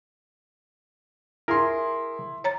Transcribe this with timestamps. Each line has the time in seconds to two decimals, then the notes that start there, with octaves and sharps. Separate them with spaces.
1.48 E4 G#4 A#4 C6
2.44 C#5 A#5 A6